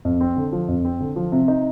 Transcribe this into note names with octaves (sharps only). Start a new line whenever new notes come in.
F2
C4
D3
F3
F2
C4
D3
F3
C3
D#4